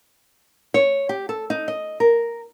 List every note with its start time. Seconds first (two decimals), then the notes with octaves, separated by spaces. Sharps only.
0.74 C#5
1.09 G4
1.29 A4
1.50 D#4
1.68 D#5
2.00 A#4